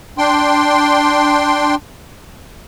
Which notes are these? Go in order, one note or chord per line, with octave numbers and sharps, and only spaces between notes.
D4 G5 C6